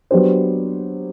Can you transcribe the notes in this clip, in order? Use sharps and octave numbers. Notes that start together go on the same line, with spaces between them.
F#3 B3 D4 G4 C5